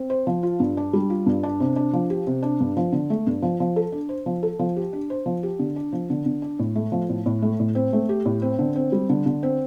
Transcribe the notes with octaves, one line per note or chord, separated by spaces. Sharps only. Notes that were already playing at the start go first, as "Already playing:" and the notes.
Already playing: C4
C5
F3
F4
G2
D4
G3
F4
G2
D4
C3
D4
F3
G4
C3
D4
G2
F3
D3
A3
G2
F3
F3
A4
D4
C5
F3
A4
F3
G4
D4
C5
F3
G4
D3
D4
F3
D3
D3
D4
A2
A3
F3
A2
A2
A3
A2
C4
A3
G4
A2
C4
D3
C4
G3
D3
D3
C4